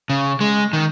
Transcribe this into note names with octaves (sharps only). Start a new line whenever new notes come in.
C#3
G#3
D#3